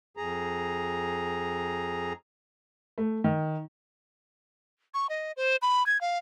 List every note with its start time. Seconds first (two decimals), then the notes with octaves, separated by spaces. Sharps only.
0.17 F2 G#4 A#5
2.98 A3
3.24 D#3
4.94 C#6
5.09 D#5
5.37 C5
5.62 B5
5.86 G#6
6.01 F5